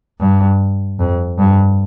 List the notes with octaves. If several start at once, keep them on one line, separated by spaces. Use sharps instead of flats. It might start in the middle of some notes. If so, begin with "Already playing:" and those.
G2
F2
G2